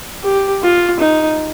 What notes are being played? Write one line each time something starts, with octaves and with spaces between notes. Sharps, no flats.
G4
F4
D#4